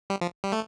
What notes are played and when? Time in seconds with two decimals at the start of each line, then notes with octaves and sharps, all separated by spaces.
0.10 G3
0.21 F3
0.44 G3
0.52 A3